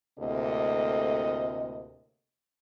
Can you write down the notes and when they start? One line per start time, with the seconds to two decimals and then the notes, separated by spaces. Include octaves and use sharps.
0.19 D2 A2 C3 A#3 A4 D#5